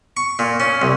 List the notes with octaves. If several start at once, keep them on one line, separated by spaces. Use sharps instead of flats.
C#6
A#2
C#4
C2